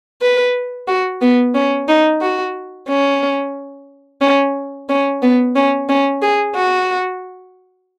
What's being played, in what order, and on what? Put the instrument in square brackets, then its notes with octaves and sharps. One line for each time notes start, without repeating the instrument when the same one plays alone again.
[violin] B4
F#4
B3
C#4
D#4
F#4
C#4
C#4
C#4
B3
C#4
C#4
G#4
F#4